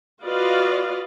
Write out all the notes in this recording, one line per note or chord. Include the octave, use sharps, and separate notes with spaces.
F4 F#4 B4 D5 D#5 F5